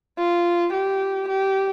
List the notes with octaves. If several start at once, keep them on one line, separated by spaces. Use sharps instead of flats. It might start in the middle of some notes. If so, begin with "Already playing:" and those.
F4
G4
G4